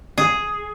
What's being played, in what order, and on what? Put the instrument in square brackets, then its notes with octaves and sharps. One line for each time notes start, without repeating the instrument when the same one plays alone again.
[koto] G#4